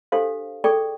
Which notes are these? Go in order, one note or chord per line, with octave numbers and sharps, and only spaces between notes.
D4 G4 A4 C5 F5
G#4 A4 D5 G5 C#6